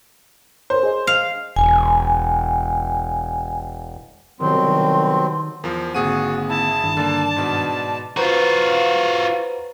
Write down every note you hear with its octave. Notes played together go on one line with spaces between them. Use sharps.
A#4 C5 C#5
G#4 D#5
F5
E1 G#5
C2 B2 D#3 F#3 C4 C6
E2 F3 A#4
G#1 D3 A#3 C4 F#4 G#4 F#5 D#7
E4 A5
G2 D#3 D4
D3 A#3 D5
G#2 B2
F4 F#4 B4 C5 A#5